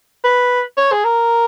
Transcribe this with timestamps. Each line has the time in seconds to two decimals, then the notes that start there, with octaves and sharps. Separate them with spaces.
0.24 B4
0.77 C#5
0.92 G#4
1.04 A#4